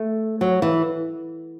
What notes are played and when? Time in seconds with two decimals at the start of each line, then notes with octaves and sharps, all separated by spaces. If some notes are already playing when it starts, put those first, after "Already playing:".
Already playing: A3
0.41 F#3
0.62 E3